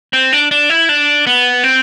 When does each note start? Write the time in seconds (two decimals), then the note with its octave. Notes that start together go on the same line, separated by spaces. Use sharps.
0.13 C4
0.33 D4
0.51 D4
0.70 E4
0.89 D4
1.27 B3
1.64 C4